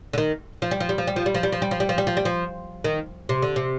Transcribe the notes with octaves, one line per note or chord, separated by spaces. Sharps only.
D3
D#3
F3
G3
F3
G3
F3
G3
F3
G3
F3
G3
F3
G3
F3
G3
F3
G3
F3
G3
F3
D#3
C3
D3
C3